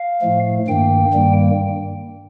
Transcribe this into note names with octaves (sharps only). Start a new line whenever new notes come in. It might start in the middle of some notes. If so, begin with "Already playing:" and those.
Already playing: F5
A2 F3 A3
G2 D#3 A#3 G5
G2 D#3 G3 A#3